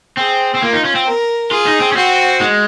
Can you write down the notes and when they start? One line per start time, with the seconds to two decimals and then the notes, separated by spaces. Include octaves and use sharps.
0.17 C4 G#4
0.55 C4
0.63 A#3 F4
0.73 D#4
0.85 C#4
0.95 C4
1.07 A#4
1.51 F4 G#4
1.66 D#4
1.81 C4
1.92 C#4
1.96 C4 F#4
2.40 G#3